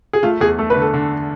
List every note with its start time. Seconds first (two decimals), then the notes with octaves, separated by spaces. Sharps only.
0.13 G#4
0.23 A3 F4
0.41 E2 G#4
0.59 A3 A4
0.70 B4
0.76 D3
0.82 A4
0.94 D3